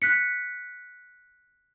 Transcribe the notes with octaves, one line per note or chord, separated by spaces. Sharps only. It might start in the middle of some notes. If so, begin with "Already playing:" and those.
F#6 B6 C#7